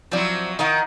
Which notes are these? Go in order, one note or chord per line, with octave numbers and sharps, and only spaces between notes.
F3 F#3 C4 E4 D5
D#3 D#4 A#4 F#5